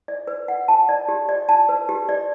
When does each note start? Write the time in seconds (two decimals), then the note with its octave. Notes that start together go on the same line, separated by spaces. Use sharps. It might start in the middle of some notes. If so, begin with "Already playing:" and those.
0.08 D5
0.27 B4
0.48 F#5
0.68 A5
0.89 D5
1.09 G4
1.29 D5
1.49 A5
1.69 B4
1.89 G4
2.09 D5